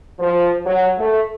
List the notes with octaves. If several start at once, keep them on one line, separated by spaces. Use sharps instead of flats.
F3
F#3
A3